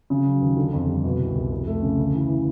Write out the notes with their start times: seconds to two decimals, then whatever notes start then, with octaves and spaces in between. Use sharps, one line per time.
0.10 C#3
0.26 F#3
0.41 D#2
0.57 D3
0.73 F2
0.88 G3
1.04 B2
1.20 C2
1.35 C2
1.51 F2
1.67 A3
1.83 C#3
1.99 D2
2.14 E3
2.30 E3